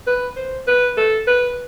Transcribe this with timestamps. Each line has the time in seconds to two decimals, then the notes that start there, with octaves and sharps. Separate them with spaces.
0.07 B4
0.37 C5
0.68 B4
0.97 A4
1.27 B4